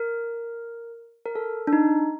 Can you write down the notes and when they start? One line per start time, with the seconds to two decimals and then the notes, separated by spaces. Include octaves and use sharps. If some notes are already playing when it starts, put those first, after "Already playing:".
Already playing: A#4
1.26 A#4
1.35 A4
1.67 D4
1.73 D#4